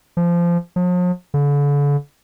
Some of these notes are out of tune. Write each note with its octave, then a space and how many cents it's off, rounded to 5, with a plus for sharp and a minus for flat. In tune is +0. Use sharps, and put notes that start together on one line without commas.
F3 -20
F3 +45
D3 -40